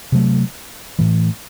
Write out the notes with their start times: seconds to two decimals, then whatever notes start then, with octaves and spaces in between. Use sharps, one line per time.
0.12 C3 F#3 A3
0.99 A2 E3 A3